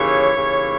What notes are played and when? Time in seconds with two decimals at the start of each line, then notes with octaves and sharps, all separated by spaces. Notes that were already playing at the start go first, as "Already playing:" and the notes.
Already playing: D#2 C#3 E3 C#5
0.35 D#2 C#3 E3